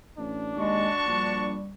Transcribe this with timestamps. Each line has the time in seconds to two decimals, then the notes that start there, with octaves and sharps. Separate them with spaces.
0.18 A1 D4
0.56 D#2 G#3 F#4 A5 C#6
1.06 A#1 G3